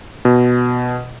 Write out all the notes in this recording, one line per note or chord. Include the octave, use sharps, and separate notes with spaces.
B2